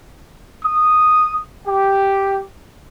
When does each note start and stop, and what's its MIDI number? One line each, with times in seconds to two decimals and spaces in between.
0.62 1.39 87
1.66 2.41 67